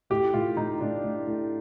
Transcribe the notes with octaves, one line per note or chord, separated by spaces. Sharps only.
A2 G4
A2 F4
A2 D#4
A2 D4
A2
A2